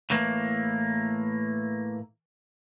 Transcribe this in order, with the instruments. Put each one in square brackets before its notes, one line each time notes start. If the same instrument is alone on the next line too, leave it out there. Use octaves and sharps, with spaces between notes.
[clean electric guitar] A2 E3 A#3